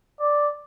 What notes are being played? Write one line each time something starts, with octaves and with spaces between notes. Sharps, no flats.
D5